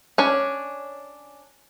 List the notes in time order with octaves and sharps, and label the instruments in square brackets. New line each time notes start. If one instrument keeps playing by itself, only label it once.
[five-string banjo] C#4 D4 C#5